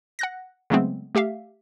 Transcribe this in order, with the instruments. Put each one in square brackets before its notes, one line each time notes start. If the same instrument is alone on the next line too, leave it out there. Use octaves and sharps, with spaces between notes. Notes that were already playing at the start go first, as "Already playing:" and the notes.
[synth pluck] F#5 F#6 A#6
C#3 F#3 G#3 A3 B3 C4
A3 G4 E5 F5